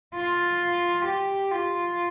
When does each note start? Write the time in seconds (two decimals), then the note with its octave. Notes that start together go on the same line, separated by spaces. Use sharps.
0.16 F4
1.06 G4
1.51 F4